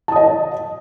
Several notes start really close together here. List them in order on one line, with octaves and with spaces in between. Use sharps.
A5 D#6 D#5